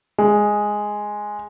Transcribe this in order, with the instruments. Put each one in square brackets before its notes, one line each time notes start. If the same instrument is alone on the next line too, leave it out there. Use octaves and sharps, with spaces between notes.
[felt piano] G#3